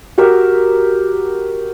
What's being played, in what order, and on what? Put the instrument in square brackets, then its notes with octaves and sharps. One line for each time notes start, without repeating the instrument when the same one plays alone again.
[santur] F#4 G4 A#4 E5